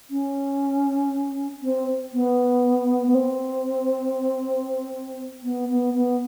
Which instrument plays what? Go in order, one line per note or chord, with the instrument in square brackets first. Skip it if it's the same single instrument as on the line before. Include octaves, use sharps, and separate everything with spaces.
[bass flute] C#4
C4
B3
B3
C4
B3
B3
B3